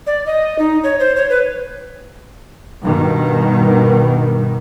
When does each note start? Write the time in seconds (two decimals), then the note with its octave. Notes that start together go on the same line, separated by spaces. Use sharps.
0.07 D5
0.26 D#5
0.59 D#4
0.84 C#5
1.00 C5
1.16 C#5
1.30 B4
2.83 G2 B2 D#3